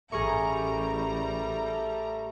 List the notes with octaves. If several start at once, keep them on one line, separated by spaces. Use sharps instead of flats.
A1 G3 A3 G#4 A#4 A#5 C#6